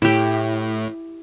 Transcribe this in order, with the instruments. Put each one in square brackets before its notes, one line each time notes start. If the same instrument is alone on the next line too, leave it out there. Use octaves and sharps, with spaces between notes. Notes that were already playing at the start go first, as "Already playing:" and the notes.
[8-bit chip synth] A2 [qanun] E4 G4